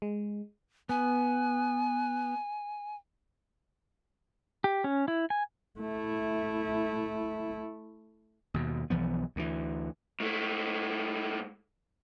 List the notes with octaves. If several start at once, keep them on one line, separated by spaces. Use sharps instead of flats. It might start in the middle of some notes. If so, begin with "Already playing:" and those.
G#3
B3 G#5
G4
C#4
E4
G#5
A3 E4
D#2 B2
B1 E3 F3 B3
D2 D3 E3
G#2 A3